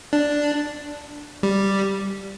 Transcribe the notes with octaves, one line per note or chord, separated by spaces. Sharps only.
D4
G3